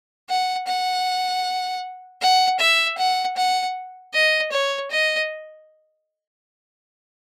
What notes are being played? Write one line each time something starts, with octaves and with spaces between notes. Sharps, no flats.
F#5
F#5
F#5
E5
F#5
F#5
D#5
C#5
D#5